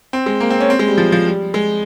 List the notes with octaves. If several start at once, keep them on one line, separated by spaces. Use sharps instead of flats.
C4
G#3
A#3
C4
C#4
C4
G#3
G3
F3
F3
G3
G#3